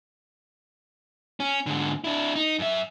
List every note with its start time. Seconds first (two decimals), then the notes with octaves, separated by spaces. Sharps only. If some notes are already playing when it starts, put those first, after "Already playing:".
1.40 C#4
1.66 G#2 D3
2.04 D4 E4
2.36 D#4
2.59 F#2 E5